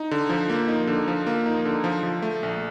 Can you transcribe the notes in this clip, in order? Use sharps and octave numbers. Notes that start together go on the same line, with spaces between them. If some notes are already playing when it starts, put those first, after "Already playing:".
Already playing: D#4
D3
F3
A#3
D#4
D3
F3
A#3
D#4
D3
F3
F3
A3
A#1